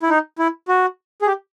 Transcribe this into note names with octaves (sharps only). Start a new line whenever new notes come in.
E4
D#4
E4
F#4
G#4
G4